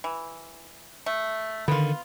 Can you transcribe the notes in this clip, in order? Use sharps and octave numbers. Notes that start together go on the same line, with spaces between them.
E3
A3
D3 D#3 B3 F4